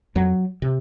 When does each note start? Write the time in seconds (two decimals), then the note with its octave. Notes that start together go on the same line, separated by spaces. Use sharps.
0.15 F2 F#3
0.62 C3